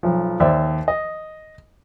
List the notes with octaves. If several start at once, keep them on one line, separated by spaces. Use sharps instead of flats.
B1 F3
D#2 C5 D5 E5
D#5